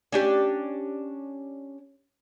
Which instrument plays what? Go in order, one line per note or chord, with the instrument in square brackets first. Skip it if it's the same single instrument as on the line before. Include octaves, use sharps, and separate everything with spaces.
[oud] C#4 D4 G4